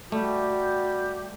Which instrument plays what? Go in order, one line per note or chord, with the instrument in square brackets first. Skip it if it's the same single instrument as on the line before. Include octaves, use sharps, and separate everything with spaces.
[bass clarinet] G3 [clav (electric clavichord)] A3 [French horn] F#4 [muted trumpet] G4